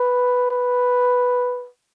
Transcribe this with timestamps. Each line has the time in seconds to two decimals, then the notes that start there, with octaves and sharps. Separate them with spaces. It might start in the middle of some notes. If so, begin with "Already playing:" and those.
Already playing: B4
0.51 B4